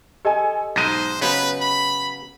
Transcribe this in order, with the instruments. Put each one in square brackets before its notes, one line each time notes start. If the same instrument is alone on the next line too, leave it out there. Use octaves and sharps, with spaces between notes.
[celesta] G4 D#5 [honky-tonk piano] A4 G#5
[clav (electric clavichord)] B1 G#2 D#4 [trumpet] C5 [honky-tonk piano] A#6 D#7 E7
[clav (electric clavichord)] C#3 F#3 B3 [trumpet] B4
[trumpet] B5